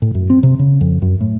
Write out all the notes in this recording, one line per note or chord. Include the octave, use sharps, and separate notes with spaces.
A2
F#2
C4
C3
C#3
F2
F#2
A2